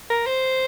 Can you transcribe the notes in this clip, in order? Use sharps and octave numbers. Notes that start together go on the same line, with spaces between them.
A#4
C5